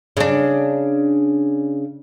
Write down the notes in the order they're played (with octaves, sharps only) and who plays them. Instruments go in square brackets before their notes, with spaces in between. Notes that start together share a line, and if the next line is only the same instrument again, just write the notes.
[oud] C#3 D4